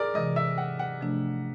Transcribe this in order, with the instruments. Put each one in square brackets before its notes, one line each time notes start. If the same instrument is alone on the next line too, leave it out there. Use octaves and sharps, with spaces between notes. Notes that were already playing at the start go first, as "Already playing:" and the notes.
Already playing: [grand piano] G#4 A#4 D5
[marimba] C3 E3 G#3 [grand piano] D#5
[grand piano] E5
F#5
F#5
[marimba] C3 F3 A3 D4